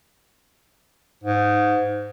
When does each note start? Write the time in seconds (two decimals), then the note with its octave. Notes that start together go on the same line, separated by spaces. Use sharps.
1.24 G#2